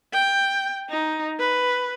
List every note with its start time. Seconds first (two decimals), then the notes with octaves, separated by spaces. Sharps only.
0.13 G5
0.90 D#4
1.39 B4